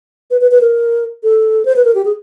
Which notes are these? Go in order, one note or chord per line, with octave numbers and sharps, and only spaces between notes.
B4
B4
B4
A#4
A4
C5
B4
A#4
G4
G#4